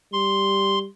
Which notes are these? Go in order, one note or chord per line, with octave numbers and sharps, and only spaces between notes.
G3 C6